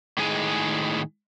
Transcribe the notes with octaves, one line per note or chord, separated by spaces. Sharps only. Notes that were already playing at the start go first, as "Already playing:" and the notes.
A2 D#3 G#3 G#4 G#5